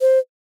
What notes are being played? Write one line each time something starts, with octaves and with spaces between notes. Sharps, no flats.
C5